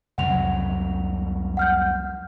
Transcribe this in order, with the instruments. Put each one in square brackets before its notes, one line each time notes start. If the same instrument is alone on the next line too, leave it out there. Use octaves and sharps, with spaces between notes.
[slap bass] C2 F2 F#3 [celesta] F#5 F7
[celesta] F#5 F6 G6